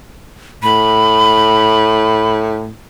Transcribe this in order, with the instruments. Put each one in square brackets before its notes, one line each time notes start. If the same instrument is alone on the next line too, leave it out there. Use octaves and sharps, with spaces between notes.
[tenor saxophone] A2 [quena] B5